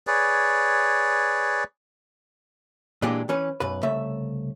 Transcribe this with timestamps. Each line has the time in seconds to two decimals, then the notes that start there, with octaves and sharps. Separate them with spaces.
0.07 G#4 B4 C#5 D5
3.02 A#2 E3 G#3 D4 G4
3.29 E3 C#4 B4
3.60 B1 F#2 B4
3.83 C2 C#3 A3 E5